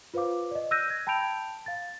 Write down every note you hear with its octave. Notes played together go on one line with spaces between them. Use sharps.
F4 B4 C5 F5 D6
D5 D#5
E6 F#6 G6 A#6 D#7
G#6
G5 A5 B5 G6 D7 F7
F5 A6